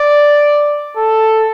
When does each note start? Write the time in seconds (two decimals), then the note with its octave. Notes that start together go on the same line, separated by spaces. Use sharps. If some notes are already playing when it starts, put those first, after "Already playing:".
Already playing: D5
0.97 A4